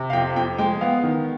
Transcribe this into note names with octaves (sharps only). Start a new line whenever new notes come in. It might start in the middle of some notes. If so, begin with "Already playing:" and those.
Already playing: C3
F5
F2 G5
F2 G5
G#3 G5
B3 F5
D#3